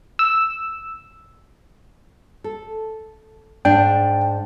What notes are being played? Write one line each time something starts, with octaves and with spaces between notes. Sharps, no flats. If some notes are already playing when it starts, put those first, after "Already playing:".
E6
A4
G#2 D4 G5